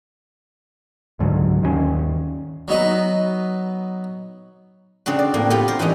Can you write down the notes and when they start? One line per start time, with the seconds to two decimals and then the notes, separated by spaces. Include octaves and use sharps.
1.19 C#2 G#2 D3 F#3
1.62 D#2 D#3 F#3 C#4
2.68 F#3 B3 D#4 B4
5.06 C#3 C4 D4 F#4
5.19 D5
5.34 A2 A#3 C4
5.50 B3 F4 G4
5.68 A#4 C5
5.79 E3 G3 C#4 D#4